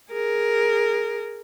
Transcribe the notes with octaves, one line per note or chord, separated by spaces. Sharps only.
G#4 A#4